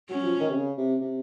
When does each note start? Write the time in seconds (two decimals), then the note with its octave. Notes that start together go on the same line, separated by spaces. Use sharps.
0.09 F#3 C#4
0.24 F3
0.40 D#3
0.50 C3
0.55 C#3
0.78 C3
1.01 C3